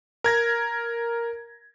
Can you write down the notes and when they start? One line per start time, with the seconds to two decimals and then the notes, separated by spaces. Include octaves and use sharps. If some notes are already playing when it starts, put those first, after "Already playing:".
0.24 A#4 G#6 A#6